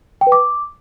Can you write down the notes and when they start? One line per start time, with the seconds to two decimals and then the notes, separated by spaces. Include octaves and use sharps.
0.21 G5
0.27 B4
0.32 D6